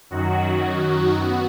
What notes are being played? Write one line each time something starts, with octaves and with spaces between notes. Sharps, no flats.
F#2 D#3 F#3 F#4
F#4
B3 F#4